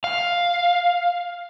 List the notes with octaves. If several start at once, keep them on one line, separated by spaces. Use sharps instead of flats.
F5